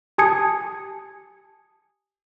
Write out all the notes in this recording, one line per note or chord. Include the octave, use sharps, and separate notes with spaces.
G4 G#5 A5 D#6 G#6 C#7